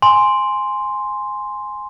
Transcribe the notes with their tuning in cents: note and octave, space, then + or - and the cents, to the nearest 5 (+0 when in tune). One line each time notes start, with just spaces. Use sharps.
G#5 +0 C6 +0